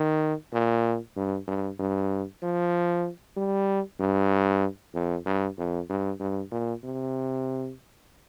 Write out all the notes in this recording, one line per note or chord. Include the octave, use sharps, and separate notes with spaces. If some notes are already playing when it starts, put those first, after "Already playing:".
Already playing: D#3
A#2
G2
G2
G2
F3
G3
G2
F2
G2
F2
G2
G2
A#2
C3